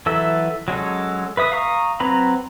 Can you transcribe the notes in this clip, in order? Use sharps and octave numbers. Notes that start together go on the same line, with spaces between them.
E3 F#3 A4 E5
F#3 G#3 C#4 A4
B4 E5 D#6
F5 A#5 C#6 D#6
F#3 C4 B4 A#5 B5